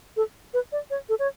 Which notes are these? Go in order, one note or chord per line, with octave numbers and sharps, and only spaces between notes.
A4
B4
D5
C#5
A4
C#5